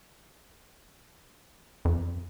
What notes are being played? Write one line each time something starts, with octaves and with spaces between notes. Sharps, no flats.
F2